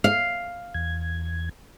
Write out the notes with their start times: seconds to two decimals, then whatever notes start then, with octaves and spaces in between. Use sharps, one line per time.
0.04 F5
0.75 E2 G#6